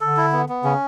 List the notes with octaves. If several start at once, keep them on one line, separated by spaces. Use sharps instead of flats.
D3 A4
E4
B3
B3
C#3 C#4